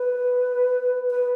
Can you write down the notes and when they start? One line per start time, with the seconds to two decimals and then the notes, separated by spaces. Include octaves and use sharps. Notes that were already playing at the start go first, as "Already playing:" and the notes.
Already playing: B4
1.10 B4